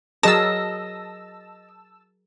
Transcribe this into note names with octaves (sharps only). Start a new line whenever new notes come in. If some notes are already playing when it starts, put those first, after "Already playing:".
F#3 G#4 A#4 D#5 A5 E6